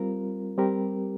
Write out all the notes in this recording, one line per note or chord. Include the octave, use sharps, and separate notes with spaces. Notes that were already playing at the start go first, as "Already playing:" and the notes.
Already playing: G3 C4 F4 A#4
G3 C4 G4 A#4